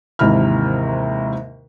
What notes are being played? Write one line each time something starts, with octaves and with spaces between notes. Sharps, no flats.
D#2 G#2 C3 E3 B5 F6